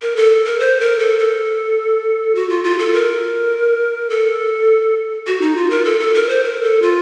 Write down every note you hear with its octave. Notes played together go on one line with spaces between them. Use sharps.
A#4
A4
A#4
C5
A#4
A4
A4
F#4
F4
F4
A4
A#4
A4
F#4
D#4
F4
A#4
A4
A4
A#4
C5
A#4
A4
F4